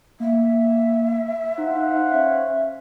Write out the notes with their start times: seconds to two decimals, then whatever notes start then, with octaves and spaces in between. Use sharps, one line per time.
0.20 A#3 E5
1.58 D#4 C5 F5 F#5
2.11 C#4 E5